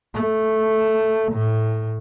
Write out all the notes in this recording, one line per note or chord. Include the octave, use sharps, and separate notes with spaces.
A3
A2